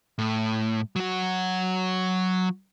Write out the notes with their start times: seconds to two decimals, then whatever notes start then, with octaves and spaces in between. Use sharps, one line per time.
0.19 A2
0.96 F#3 F#4